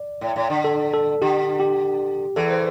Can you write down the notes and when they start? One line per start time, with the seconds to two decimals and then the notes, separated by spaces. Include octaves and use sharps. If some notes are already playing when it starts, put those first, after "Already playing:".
Already playing: D5
0.21 A2
0.36 A2
0.50 D3
0.64 A4
0.93 A4
1.22 D3 G4
1.60 G4
2.36 E2 E3 A4
2.51 C5